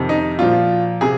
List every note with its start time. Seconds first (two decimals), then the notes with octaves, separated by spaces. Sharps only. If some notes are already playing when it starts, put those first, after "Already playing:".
Already playing: F2 C3 D#3
0.09 D#4
0.39 A#2 F3 F4
1.01 C3 G#4